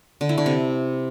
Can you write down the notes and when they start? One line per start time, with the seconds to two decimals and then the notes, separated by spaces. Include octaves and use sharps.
0.21 D3
0.29 E4
0.38 D3
0.46 C3